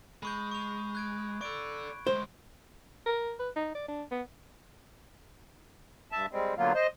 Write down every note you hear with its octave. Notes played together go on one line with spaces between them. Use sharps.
G#3 B5 C#6 G6
C#6 F7
F#6 G#6 D7
A4 D5 C#6 D7
D2 G#3 C5
A#4
B4
D#4
D5
D4
B3
G2 E5 A5
G3 G#3 C4
D3 F#3 A#3 B3 F4
C5 D#5